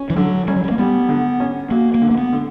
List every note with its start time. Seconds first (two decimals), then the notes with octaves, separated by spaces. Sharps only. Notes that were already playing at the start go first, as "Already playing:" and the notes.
Already playing: C#4
0.10 E3
0.16 D3 F#3
0.48 G3 C#4
0.56 F#3
0.64 G3
0.71 A#3
0.78 G3 B3
1.09 D3
1.40 C#4
1.71 A#3 F#4
1.94 A#3
2.02 D3
2.11 A#3
2.18 B3
2.33 D3